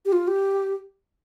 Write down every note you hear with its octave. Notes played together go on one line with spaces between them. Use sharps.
G4
F4
G4